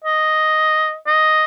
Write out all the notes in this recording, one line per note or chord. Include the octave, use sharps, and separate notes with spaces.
D#5
D#5